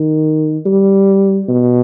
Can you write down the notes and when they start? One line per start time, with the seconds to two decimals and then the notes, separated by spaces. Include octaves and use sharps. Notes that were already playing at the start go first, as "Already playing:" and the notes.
Already playing: D#3
0.66 G3
1.49 B2